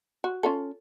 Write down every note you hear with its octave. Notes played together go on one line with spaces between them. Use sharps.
F#4
C#4 F4 A4